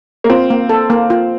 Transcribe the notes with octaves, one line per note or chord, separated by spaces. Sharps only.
A#3
C4 F4
A#3
A4
A#3
F4